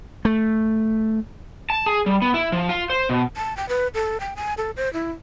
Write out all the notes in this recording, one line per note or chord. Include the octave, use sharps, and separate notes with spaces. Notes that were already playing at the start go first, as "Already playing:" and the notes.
A3
A5
G#4
G3
B3
E4
F3
F4
C5
B2
A5
G5
B4
A4
G5
G#5
A4
C5
E4